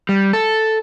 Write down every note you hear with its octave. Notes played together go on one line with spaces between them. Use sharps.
G3
A4